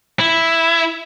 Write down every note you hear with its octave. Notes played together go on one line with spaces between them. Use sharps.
E4